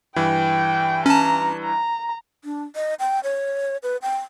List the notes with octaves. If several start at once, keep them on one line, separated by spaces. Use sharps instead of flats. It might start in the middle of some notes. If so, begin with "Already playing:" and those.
G2 E3 G5
C#4 A5 A#5
A#5
D4
D#5
G5
C#5
B4
G5